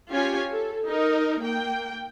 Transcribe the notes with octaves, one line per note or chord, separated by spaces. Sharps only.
C#4 F4 G4 C#5 G#5
A4
D#4 A#4
A#3 G5